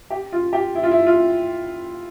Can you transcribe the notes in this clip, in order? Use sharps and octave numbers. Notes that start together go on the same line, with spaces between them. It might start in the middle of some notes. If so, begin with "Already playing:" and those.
G4
F4
G4
E4
F4
E4
F4